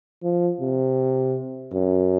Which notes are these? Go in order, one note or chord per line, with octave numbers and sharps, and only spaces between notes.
F3
C3
F#2